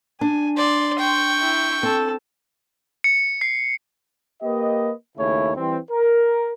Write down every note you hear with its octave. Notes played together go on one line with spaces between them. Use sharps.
D4 G#5
D5 C6
G5 C#6
E4
C4 A4
C#7
C7
A#3 G4 B4 D#5
D#2 C#3 A3 E4 C#5
E3 G3 C4
A#4